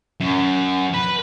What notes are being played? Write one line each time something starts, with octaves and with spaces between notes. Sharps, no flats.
F#2
B4